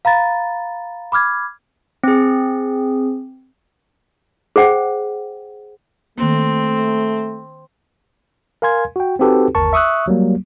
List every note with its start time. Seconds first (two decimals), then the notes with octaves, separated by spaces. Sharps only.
0.05 F5 A#5 B5 A6
1.12 B5 D6 F6 G#6
2.03 C4 G#4
4.56 G#4 C5 F#5 G5
6.18 D#3 A3 A#3 C4
8.62 A#4 F5 G#5 C6 G#6
8.96 F#4 G5
9.19 C4 D#4 F#4 G4 A4 B4
9.55 G1 D#2 A#4 A5 C#6
9.73 E5 C#6 D#6 E6 F#6
10.08 F#3 G3 A#3